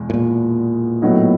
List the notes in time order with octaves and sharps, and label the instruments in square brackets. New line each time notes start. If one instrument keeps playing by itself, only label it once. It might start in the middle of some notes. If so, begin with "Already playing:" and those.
Already playing: [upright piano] E2 B2 G#3
[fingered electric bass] A2
A#2
[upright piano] A2 F#3 B3 D#4